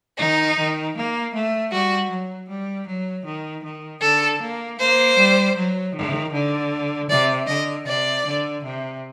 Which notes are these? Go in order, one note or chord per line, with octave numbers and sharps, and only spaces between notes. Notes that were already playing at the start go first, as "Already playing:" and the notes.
D#3 D#4
D#3
A#3
A3
G3 F#4
F#3
G3
F#3
D#3
D#3
D3 A4
A#3
A#3 C5
G3
F#3
D#3
D3
C3 D5
D3 D#5
C3 D5
D3
C3